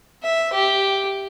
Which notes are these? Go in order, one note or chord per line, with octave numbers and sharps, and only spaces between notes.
E5
G4